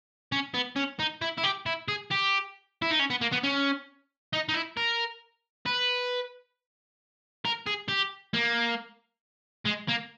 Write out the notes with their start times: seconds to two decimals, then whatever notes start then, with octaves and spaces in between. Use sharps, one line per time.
0.32 C#4
0.54 B3
0.76 C#4
1.00 D#4
1.21 E4
1.38 E4
1.43 G4
1.66 E4
1.88 G#4
2.11 G4
2.82 E4
2.91 D#4
2.99 C#4
3.10 B3
3.21 A#3
3.32 B3
3.43 C#4
4.33 D#4
4.49 D#4
4.54 E4
4.77 A#4
5.66 B4
7.45 A#4
7.66 G#4
7.88 G4
8.34 A#3
9.66 G#3
9.89 A#3